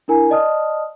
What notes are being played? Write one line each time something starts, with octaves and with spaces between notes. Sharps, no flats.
D4 E4 A#4 G#5 A#5
D5 D#5 A5 D#6 F6